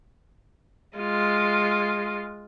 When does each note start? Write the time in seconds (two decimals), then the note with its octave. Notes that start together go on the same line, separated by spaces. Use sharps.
0.98 G#3 F4